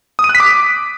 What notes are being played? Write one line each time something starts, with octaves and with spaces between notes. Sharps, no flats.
D#6
D#7
F#6
B6
D6